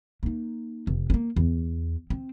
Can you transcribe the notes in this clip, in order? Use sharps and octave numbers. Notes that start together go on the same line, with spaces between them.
A#3 D#4
F1
A#3 C#4
E2
C4